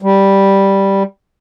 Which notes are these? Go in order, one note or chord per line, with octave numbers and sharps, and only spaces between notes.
G3